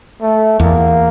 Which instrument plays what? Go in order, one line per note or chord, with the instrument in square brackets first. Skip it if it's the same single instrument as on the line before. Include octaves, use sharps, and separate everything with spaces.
[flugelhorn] A3
[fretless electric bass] E2 [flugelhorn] A#3